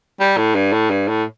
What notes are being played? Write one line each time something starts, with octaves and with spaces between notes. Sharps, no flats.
G3
A2
G2
A2
G2
A2